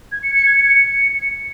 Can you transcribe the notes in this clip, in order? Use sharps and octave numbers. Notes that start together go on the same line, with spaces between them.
G#6
C#7
C#7
G#6
C#7